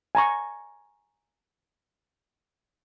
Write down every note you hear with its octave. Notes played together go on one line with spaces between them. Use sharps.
G#5 A#5 C#6